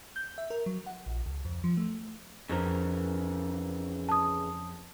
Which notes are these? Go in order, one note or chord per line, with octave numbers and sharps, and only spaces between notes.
G6
E5
A#4
F#3
F#5
A#1
C#2
F2
F3
A3
F2 C#3 E3 A#4
A5 D#6